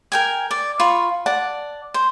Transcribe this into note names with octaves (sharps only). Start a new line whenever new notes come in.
A#4 G5 G#5
D5
F4 B5 C#6
D5 F#5 A5
C5